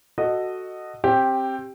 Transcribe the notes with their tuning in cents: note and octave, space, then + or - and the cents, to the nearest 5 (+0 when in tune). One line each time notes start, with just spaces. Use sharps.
F#4 +0 A4 +0 D#5 -10
C4 +20 G4 +0